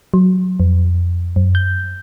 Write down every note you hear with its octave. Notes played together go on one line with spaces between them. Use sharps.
F#3
F2
F#2
G6